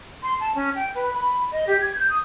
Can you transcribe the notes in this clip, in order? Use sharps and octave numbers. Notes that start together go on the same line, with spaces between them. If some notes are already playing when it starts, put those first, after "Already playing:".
C6
A5
C#4
G5
B4
B5
D#5
G4
G#6
G6
D#6